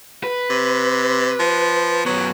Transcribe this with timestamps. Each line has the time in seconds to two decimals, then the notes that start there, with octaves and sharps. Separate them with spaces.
0.24 B4
0.50 C3
1.40 F3
2.06 F#2 F#3 B3